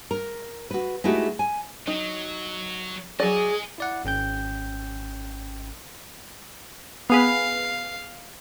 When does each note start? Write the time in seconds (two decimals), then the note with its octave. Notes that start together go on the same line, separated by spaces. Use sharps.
0.11 A#4
0.71 F#4 B4
1.04 G#3 A3 D#4 E4 F#4 G4
1.39 G#5
1.87 F#3 D#4
3.20 F#3 G#4 D5 D#5 G#5
3.78 E4 D5 F#5
4.05 G#1 C#4 G5 G6
7.10 B3 G#4 B4 F5